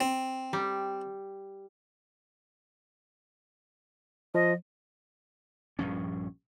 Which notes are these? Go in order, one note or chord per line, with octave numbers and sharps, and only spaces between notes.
C4
G3
F3 D#5
A#1 G2 F3 C#4